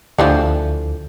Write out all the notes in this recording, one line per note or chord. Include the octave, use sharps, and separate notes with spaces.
D2 D3 E3 F3